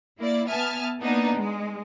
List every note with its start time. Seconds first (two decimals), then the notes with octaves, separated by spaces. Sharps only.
0.19 A#3 E4 D5
0.48 B3 E5 G#5 A5 F6
1.01 A#3 B3 D4 D#4
1.36 G#3